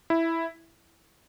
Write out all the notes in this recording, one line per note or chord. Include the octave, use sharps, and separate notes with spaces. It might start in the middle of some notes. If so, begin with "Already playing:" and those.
E4